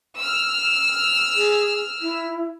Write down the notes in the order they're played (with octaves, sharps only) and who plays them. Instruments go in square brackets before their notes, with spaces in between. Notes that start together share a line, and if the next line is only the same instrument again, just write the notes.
[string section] E6 F6
[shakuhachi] G#4
E4